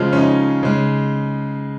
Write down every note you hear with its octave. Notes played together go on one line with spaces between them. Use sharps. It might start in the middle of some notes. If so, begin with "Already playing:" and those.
Already playing: C#3 F3 G#3 F4
C#4
D#4
C#3 G#3